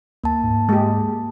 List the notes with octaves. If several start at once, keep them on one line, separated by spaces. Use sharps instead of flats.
D2 A#3 A5
G#2
G#3 G4